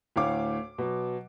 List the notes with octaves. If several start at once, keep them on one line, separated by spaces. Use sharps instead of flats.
D2 A2 C#5 F5 D6
B2 F#3